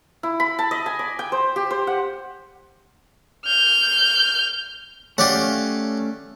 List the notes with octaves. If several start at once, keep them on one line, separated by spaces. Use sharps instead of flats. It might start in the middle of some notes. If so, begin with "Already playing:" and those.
E4
B5
A5
D#5
G#5
D5
G5
C5
G4
C5
F#5
F6 G6
A3 C#4 G4 C#5 D5 F5 F#5